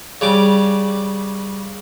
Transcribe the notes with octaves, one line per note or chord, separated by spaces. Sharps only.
C#3 G3 D6